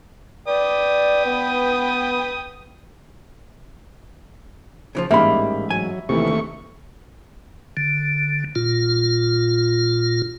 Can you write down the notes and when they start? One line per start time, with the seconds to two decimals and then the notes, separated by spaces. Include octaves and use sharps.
0.48 B4 D5 G5 D#6
1.26 B3
4.95 C#3 E3 F3
5.11 A1 G#2 G3 A#3 E5 F5 B5
5.70 F#3 G#5
6.09 D#2 C3 E3 A3 C#6
7.77 D3
8.56 A#2 F4